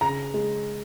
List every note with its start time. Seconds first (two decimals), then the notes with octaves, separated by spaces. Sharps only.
0.01 C#3 A#5
0.34 G#3